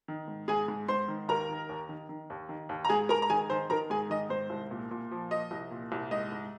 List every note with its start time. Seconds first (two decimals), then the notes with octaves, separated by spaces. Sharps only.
0.08 D#3
0.28 G#2
0.48 G#2 G#4 G#5
0.68 G#2
0.88 G#2 C5 C6
1.08 D#3
1.28 D#2 A#4 A#5
1.49 D#3
1.69 D#2
1.89 D#3
2.09 D#3
2.30 D#2
2.49 D#3
2.69 D#2
2.85 A#5
2.89 G#2 G#4 G#5
3.09 G#2 A#4 A#5
3.22 A#5
3.29 D#3 G#4 G#5
3.50 D#3 C5 C6
3.70 D#3 A#4 A#5
3.90 G#2 G#4 G#5
4.10 D#3 D#5
4.30 G#2 C5
4.50 C2
4.71 A#2
4.91 A#2
5.11 F3
5.31 F3 D#5
5.51 C2
5.71 A#2
5.92 C2
6.11 G#2 D#5
6.32 G#2